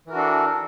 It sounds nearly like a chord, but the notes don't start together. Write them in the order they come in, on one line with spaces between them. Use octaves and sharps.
E3 A#4 F#4 D4 A4